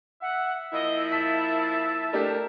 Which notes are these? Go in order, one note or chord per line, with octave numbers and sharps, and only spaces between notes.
E5 F#5
F3 A#3 E4 D#5
A5 B6
A3 D4 G4 A#4